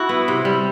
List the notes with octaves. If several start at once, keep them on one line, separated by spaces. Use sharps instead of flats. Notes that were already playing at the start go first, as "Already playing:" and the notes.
Already playing: E4 F#4
B3
C3
G3